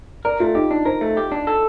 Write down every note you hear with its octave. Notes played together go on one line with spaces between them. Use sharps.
A#4 D5
A3 F4
D#4 G4
D4
A#4 C5
A3
G4
D4
A4